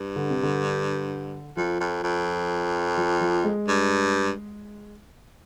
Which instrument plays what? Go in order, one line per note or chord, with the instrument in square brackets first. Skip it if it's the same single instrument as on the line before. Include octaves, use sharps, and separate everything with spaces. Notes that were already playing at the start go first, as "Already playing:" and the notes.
Already playing: [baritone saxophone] G2
[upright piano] D3
C3
D3
[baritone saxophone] F2 [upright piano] F3
[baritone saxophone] F2
F2
[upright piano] F3
F3
G#3
[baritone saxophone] G2